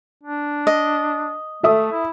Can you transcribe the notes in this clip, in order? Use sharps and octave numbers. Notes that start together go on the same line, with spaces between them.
D4
D#5
A3 A4 E5 D#6
E4